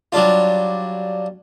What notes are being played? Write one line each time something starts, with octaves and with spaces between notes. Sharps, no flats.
F#3 G3 D4 F4